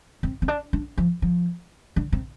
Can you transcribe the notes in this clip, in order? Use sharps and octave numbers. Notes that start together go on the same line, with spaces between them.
C4
C4
D4
D4
F3
F3
D3
C3